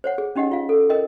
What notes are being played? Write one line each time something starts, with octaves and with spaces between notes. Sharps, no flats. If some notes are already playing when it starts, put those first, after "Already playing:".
C5 C#5 F#5
G#4
C#4 D#4 G4 D#5 F#5
F4 F5
A4
A#4 D#5 G5